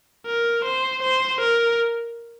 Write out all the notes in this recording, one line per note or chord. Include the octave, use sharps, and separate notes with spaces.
A#4
C5
C5
A#4